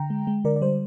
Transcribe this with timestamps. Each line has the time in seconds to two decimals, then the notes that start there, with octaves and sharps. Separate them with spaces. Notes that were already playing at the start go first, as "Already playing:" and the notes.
Already playing: D3 G5 A#5
0.10 G#3
0.27 G#3
0.44 D3 A#4 D5
0.56 D5
0.61 G3 C5